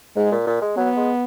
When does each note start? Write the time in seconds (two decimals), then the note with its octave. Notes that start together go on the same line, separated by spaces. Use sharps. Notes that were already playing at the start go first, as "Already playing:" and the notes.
0.16 G#2 G#3
0.32 A#2
0.47 A#2
0.62 G#3
0.76 F#3 B3
0.96 G#3